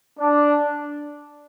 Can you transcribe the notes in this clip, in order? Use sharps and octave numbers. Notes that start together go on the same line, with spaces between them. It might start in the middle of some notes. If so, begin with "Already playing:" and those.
D4